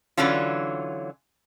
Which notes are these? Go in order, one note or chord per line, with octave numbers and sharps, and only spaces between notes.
D3 E3 F#3 C#4 F4